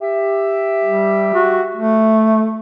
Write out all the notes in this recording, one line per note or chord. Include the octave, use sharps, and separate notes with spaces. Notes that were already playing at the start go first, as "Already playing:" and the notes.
G4 E5
G3
F#4
A3